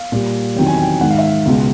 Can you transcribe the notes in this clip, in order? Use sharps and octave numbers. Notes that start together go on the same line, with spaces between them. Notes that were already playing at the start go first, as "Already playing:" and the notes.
Already playing: F5
A#2 G3
E2 C3 D#3 F#3 G5
G#5
G5
G#2 D#3 G#3 F#5
F5
E5
F5
C#2 B2 G#3